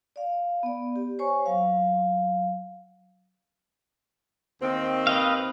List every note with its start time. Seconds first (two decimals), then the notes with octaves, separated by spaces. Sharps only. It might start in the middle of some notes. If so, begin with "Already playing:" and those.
0.16 D5 F5
0.63 B3 D5
0.96 G4
1.19 C5 C#5 G#5 C#6
1.46 F#3 F5
4.62 D#2 D#3 C4
5.07 B4 D#5 F5